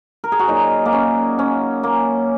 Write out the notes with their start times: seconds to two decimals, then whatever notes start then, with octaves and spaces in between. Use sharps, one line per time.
0.24 A#4
0.32 G#4
0.39 F#4
0.48 A#2 F#3 D#4
0.86 A#3
0.93 C#4
1.39 C#4
1.83 A#3